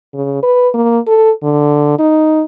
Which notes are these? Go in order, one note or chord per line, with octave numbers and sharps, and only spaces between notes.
C#3
B4
A#3
A4
D3
D#4